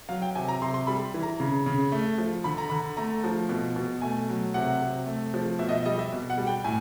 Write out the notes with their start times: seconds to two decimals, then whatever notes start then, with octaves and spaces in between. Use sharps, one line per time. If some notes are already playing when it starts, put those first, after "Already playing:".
0.09 F#3 F5
0.22 G5
0.35 C3 G#5
0.48 A#5
0.62 C3 C6
0.74 C6
0.87 G3 B5
1.14 E3
1.23 A#5
1.40 C#3
1.66 C#3
1.92 A3
2.18 F3
2.44 D3 B5
2.58 A#5
2.70 D3 B5
2.97 A3 A#5
3.24 F3
3.49 B2
3.76 B2
4.02 A3 G#5
4.29 F#3
4.54 C3 F#5
4.81 C3
5.06 A3
5.34 F3
5.59 B2 E5
5.69 D#5
5.72 E5
5.86 G3 D#5
5.99 E5
6.13 B2
6.30 F#5
6.38 G3
6.47 G5
6.64 A2 G#5